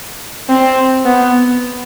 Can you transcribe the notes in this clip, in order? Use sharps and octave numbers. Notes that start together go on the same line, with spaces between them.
C4
B3